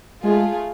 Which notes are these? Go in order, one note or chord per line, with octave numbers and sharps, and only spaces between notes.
G#3 A3 F4 G#4